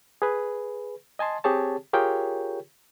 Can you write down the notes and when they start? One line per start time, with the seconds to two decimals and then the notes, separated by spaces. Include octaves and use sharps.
0.22 G#4 B4
1.19 D#5 G#5 A5 C6
1.44 C4 G4 G#4 C#5 A5
1.93 F4 G4 G#4 A#4 C#5 G5